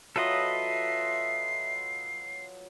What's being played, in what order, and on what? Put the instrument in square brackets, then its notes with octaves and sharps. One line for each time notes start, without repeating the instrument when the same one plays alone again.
[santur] F#3 F4 D#6 [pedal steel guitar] A4 B4 D#5 [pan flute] E5 [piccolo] C7